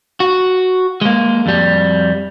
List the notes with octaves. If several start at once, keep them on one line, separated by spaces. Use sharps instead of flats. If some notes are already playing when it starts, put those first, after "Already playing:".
F#4
G#3 A#3
F2 G3